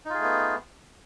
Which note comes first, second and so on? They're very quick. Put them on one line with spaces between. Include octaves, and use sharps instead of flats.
D#4 F4 G#4 A3 B3